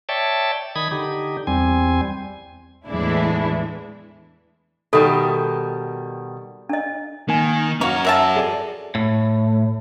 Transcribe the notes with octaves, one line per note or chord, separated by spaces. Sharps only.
C#5 D5 E5 G5 A5
D#3 B5 D#6 G#6
D3 D#4 G4
E2 G3 C4 G#5
E2 A2 E3 G#3 D4 E4
B2 D#3 G3 A4
D4 D#5
D#3 A#3 G#5
C#4 F#4 C#5 F5 A#5
A#4 E5 A5
G#4 A4 D5
A2